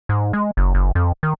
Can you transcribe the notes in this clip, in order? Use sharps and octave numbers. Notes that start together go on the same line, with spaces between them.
G#2
G#3
F#1
F#1
F2
D#3